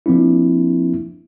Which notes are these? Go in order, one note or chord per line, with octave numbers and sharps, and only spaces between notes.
F3 A#3 C4 D4 E4